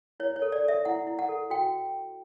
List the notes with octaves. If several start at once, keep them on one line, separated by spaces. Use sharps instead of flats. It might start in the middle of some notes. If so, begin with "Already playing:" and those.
E4 C#5
C#5
A4
D5
A4 E5
E4 F#5
E4
F#5
A4
F#4 G5